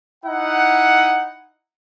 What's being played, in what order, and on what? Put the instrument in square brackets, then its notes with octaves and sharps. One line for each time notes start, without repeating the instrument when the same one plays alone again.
[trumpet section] D#4 E4 F#5